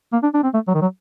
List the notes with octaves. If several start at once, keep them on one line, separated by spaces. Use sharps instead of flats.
A#3
D4
D4
C4
A3
F#3
D#3
F#3